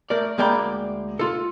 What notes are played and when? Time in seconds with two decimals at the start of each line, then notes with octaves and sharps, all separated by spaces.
0.10 A3 A#4 D5
0.38 D2 G#3 A#3 D5 G5 B5
1.19 F4 A4